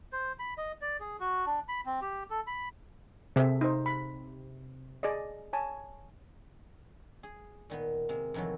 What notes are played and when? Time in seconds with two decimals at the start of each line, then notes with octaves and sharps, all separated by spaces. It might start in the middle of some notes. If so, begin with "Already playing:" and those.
0.12 C5
0.39 B5
0.58 D#5
0.82 D5
1.00 G#4
1.20 F#4
1.46 D4
1.68 B5
1.86 C4
2.01 G4
2.30 A4
2.47 B5
3.36 C3 G#4 A4 E5
3.61 D#4 C5
3.86 B5
5.03 G#4 D5 D#5
5.53 C#5 G#5 A5
7.23 G#4
7.70 A#2 D#3 B3
8.09 C3 G#3 A#3
8.34 F2 C3 D#3 E3 F#3